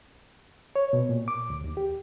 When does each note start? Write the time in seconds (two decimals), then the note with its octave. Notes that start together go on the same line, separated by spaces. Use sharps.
0.76 C#5
0.93 B2
1.09 A#2
1.28 D6
1.50 D2
1.64 D#2
1.77 G4